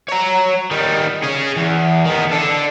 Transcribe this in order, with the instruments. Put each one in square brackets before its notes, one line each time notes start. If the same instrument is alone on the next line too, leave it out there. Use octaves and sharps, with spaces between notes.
[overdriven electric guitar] C#5 A#5
D#3 G3
C#4 G#4
E2
D#3 B3
D4 A4